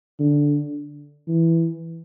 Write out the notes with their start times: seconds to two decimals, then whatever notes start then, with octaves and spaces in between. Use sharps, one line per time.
0.19 D3
1.28 E3